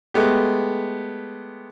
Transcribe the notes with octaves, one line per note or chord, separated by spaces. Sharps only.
G#3 A3 B3 G4